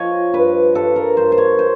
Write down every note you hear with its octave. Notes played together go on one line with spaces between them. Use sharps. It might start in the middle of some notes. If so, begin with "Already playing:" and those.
Already playing: F3 C#5 D#5
G2 B4
G2 A4
A#4
G2 C5
C5
C#5
C5